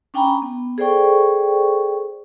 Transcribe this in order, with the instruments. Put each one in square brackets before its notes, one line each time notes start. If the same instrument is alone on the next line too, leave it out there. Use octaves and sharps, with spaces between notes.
[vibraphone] C#4 D4 G5 G#5 A#5 B5
B3
G#4 A4 C5 D5 G5 C#6